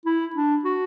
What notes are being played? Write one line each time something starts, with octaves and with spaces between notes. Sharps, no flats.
E4
D4
F#4